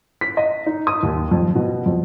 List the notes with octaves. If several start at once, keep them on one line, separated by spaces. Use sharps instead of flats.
B6
D#5
D#4
D#6
D#2
F2
B2
F2